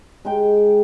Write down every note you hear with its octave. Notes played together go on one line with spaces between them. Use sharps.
G#3 D#4 G5